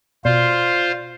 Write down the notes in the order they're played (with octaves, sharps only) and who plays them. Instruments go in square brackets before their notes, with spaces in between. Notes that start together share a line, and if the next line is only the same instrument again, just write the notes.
[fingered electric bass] B2 [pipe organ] F4 C5 [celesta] D5